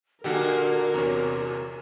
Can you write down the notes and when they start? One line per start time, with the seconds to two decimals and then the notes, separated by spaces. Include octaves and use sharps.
0.24 A#2 D3 A#3 F#4 G4 A4 A#4 F#5
0.94 E2 C3 C#5